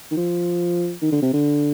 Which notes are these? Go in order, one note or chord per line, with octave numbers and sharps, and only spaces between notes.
D#3
F3
D#3
D3
C3
D3